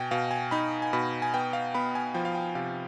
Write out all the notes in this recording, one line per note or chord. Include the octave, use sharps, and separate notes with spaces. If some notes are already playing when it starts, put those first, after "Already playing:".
Already playing: B2 G5 G#5
B2 F5
G#5
D#4 B5
G#5
B2 B5
G#5
B3 G5
F5
B3 B5
G#5
F3 G5
F5
G5
C3 F5